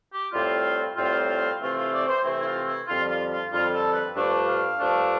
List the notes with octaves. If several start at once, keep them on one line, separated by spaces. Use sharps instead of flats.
G4
A2 G3 C4 F4
A2 G3 C4 F4
F4
C3 E3 A3 C4 F4
F4
D5
C5
C3 E3 A3 C4 E4
E4
F4
E4
F2 D3 G3 F4
F4
F4
F2 D3 G3 F4
A4
B4
G2 F3 A3 D4 D5
F5
G2 F3 A3 D4